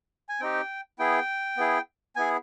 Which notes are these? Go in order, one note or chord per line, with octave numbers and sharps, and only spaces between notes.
G#5
C4 D#4 G4 G5
B3 E4 G#4 G5
B3 E4 G#4
B3 E4 G#4 G#5